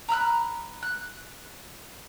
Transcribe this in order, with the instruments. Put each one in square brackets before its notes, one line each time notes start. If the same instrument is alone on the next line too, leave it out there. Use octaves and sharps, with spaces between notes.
[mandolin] A#5 B5 E6 F#6
F#6